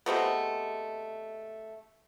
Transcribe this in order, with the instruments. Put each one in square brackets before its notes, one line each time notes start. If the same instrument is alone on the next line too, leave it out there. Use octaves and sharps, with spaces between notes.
[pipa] C3 G#3 A3 B3